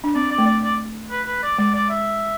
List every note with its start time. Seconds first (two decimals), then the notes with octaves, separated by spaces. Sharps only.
0.04 D4
0.15 C4 D5
0.31 D5
0.38 A3
0.46 D5
0.63 D5
1.10 B4
1.27 B4
1.43 D5
1.58 G#3 D5
1.74 D5
1.90 E5